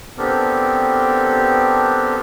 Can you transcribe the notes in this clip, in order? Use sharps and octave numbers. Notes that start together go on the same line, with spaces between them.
B3 C4 D4 G4 A4 A#4